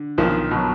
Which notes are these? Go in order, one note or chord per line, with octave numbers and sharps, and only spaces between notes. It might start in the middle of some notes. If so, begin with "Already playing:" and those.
Already playing: D3
B1 D#3 F3
B2 F#3